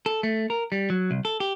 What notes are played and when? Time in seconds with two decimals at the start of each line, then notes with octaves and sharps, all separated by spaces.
0.06 A4
0.23 A3
0.50 A#4
0.72 G3
0.90 F#3
1.11 C2
1.25 A4
1.40 G4